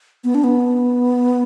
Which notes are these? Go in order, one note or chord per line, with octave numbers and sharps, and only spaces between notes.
B3
D4
B3